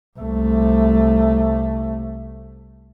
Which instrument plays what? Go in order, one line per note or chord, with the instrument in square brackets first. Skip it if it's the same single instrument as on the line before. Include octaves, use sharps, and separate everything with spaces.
[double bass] C2 A3